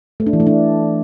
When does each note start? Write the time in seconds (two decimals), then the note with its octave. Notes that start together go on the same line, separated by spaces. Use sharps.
0.20 A3
0.27 D4
0.33 E3
0.40 A3
0.47 D4